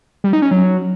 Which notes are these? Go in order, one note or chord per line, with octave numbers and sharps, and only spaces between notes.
G3
D#4
C#4
F#3